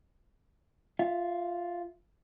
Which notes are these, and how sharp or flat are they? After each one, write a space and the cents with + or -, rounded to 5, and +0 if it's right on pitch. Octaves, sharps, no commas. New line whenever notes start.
F4 +0 E5 +25